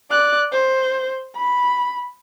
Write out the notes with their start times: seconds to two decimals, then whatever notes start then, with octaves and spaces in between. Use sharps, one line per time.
0.11 D5 F#6
0.52 C5
1.36 B5